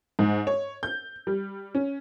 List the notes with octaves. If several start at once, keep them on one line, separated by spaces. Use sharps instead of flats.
G#2
C#5
G6
G3
C#4